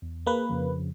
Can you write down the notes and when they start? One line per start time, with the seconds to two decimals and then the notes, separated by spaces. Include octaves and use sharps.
0.02 E2
0.26 A#3 G#4 B4
0.49 F2 C#3 F3